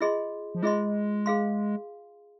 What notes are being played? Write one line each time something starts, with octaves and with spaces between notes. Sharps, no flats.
F4 G#4 D#5 C6
F3
G#3 F4 G#4 D#5 C6
G#4 F5 C6